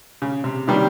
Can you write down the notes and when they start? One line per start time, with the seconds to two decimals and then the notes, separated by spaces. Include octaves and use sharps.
0.22 C#3
0.44 C3
0.68 C3 D#3 F#3 G3 A#3 G4